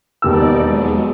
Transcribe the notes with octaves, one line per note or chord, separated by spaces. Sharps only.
E1 D#2 D#4 D5 E6
F#3 G#3